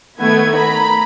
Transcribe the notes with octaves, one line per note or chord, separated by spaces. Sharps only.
D#3 A3 B3 G#6
A#5 B5